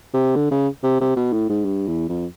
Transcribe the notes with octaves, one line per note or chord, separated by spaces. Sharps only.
C3
D3
C#3
C3
C3
B2
A2
G#2
G2
E2
F2